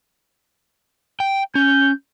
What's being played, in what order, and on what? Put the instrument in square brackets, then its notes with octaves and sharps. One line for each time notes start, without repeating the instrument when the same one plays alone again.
[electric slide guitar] G5
[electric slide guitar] C#4 [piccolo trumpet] G6